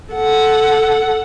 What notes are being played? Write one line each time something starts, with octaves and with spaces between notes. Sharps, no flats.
A4 F#5